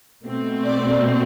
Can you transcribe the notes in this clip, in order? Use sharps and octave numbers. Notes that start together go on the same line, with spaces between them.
B2 A3 C4
D5